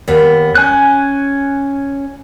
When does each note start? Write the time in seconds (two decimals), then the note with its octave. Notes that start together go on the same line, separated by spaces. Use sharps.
0.08 D#2 B3
0.55 C#4 G#5 F#6